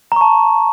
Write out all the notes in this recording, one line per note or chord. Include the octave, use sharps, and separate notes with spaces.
A5 A#5 C#6